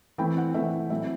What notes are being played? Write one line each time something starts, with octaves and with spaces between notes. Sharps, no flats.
E3 A3 C4 E4 G5
F#5
E3 A3 C4 E4 E5
A2 F#3 C4 E4 E5